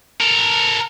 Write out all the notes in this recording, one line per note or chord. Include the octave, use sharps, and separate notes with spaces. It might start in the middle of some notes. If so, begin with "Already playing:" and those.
A4 A#4